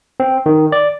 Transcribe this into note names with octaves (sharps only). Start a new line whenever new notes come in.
C4
D#3
D5